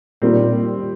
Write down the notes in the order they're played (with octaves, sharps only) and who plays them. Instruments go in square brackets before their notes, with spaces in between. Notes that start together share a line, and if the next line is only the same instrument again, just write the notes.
[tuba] A#2 [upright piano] D#3 G3 C4